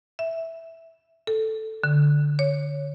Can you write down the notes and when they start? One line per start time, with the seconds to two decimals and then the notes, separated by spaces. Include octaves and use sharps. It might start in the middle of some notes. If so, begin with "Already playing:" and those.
0.19 E5
1.27 A4
1.84 D3
2.39 C#5